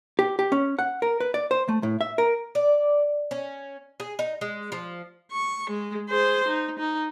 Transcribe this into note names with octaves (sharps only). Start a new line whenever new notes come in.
G4
G4
C#4
F#5
A#4
B4
D5
C5
A3
A2
E5
A#4
D5
C#4
G#4
D#4
G#3
F3
C#6
G#3
G#4 C5
D#4
D#4